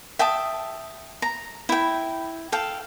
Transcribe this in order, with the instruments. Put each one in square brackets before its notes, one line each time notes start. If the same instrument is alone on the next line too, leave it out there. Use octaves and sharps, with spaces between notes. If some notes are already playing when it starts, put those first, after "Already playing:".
[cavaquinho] E5 G5 A5 D#6
A#5
E4 G5
A4 F5 G5